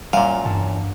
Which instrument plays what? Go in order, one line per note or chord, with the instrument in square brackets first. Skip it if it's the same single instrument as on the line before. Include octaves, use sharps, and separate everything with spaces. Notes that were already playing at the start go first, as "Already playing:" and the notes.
[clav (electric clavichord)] F#2 A#2 [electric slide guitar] G3 [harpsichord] F5
[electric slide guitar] E2 C#5 A5 [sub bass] G2